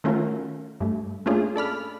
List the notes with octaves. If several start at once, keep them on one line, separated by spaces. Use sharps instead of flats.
D#3 A3 C#4 F4 F#4 A#4
G2 A3
A3 A#3 C#4 D4 F4 G#4
A4 D5 B5 F6